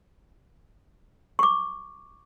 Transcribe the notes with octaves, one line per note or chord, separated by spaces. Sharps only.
C#6 D6